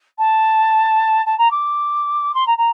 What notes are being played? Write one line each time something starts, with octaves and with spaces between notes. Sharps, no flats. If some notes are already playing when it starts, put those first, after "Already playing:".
A5
A5
A#5
D6
C6
A#5
A#5